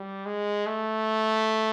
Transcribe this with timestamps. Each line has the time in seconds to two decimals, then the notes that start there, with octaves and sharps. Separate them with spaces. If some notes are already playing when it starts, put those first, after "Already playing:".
Already playing: G3
0.26 G#3
0.67 A3